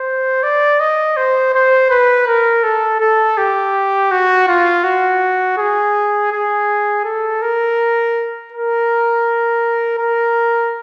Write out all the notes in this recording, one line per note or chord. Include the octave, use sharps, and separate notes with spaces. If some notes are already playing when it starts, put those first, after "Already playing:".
Already playing: C5
D5
D#5
C5
C5
B4
A#4
A4
A4
G4
F#4
F4
F#4
G#4
G#4
A4
A#4
A#4
A#4